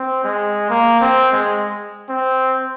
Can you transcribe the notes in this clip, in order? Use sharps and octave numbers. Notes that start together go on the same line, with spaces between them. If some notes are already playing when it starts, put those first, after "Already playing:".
Already playing: C4
G#3
A#3
C4
G#3
C4